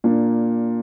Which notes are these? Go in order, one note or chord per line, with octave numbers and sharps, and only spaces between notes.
A#2 A#3 D4